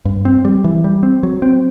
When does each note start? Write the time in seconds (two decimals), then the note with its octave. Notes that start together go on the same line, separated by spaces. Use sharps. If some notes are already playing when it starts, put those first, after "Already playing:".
0.05 G2
0.25 C4
0.45 G3
0.64 E3
0.84 G3
1.03 C4
1.23 F#3
1.42 C4